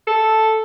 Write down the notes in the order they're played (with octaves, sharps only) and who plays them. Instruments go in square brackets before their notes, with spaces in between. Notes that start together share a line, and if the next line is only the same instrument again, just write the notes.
[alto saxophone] A4